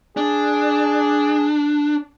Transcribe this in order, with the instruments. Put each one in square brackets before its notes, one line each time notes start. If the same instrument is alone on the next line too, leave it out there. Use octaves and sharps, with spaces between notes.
[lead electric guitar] D4 [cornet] G#4